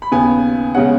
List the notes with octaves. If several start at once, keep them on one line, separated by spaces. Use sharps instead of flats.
B5
D#2 C#3 B3 G#5
C#3 G#3 C#4 F#5